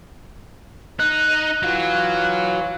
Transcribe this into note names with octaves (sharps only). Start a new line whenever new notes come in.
D#4 F#6
E3 F#3 F4